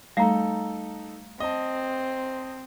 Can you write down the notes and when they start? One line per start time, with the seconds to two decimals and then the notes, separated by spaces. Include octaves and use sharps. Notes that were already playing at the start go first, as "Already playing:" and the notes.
0.17 G3 A3 D#4 A4 F5 A#5
1.40 C4 D#5 A5